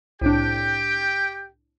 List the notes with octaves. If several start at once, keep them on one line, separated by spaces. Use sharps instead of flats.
C2 A2 D4 G4 G5